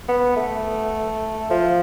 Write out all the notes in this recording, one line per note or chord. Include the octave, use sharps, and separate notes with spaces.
B3
A3
F3